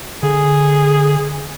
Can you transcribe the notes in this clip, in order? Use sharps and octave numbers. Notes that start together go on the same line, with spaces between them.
D3 G#4